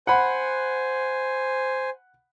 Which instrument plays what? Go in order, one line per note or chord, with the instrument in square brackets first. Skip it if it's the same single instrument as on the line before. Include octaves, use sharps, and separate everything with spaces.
[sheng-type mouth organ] C5 G#5 [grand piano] F#5 B5